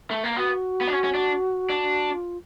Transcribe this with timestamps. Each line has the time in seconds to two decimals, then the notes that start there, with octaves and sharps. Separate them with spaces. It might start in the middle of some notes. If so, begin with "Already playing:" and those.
0.11 A3
0.24 A#3
0.36 B3 F#4
0.81 B3
0.87 D4
0.93 C#4
1.04 C#4
1.14 D4
1.70 D4
2.14 F4